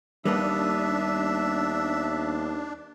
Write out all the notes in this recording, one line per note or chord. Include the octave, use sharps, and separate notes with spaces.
D#2 G3 A#3 B3 D4 E5